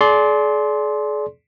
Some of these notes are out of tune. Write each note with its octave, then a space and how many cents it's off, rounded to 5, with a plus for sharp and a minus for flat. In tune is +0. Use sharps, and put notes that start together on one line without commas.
G#4 +40 D5 -15 C6 +0